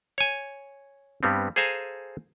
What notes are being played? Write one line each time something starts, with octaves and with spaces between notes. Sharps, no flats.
C#5 G#5
G2 G3 B3 C4
G#4 A4 C5 F5 G#5 A#5